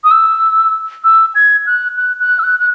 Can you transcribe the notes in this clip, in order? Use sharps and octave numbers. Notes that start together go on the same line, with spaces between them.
D#6
E6
E6
G#6
F#6
F#6
F#6
E6
F#6
F#6